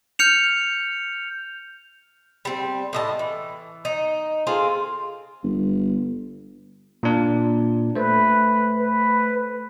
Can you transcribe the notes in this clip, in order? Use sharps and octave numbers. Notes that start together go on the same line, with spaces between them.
F6 G6 C#7 F7
G3 C4
A2 D#5 A5
E3
D#4
C4 F4 G#4 A4
G1
A#2 D4
A3 B4 C5
B4